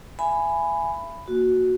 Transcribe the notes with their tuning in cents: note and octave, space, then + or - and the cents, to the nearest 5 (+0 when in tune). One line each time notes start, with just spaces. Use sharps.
E5 +35 G#5 +0 B5 +10
A#3 +5 F#4 +0